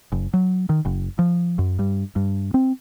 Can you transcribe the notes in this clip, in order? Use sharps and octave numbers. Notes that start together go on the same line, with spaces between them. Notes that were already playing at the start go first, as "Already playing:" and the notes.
F#1
F#3
D#3
F#1
F3
F#2
G2
G2
C4